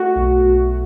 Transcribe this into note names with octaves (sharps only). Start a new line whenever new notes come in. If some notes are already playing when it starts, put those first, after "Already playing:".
Already playing: A3 F#4
B1
B1